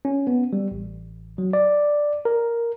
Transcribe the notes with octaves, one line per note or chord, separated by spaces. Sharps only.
C#4
B3
G3
A1
F#3
D5
A#4